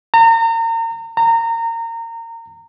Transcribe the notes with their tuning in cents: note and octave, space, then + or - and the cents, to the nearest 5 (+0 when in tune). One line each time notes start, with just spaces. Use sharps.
A#5 -35
A#5 -25